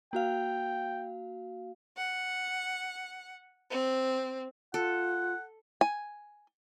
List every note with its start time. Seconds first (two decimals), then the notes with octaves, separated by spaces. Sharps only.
0.13 A#3 F#4 F5 G5
1.97 F#5
3.70 C4
4.74 F4 A4 F#5
5.81 G#5